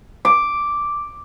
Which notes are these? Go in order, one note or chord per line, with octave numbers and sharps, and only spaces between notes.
D6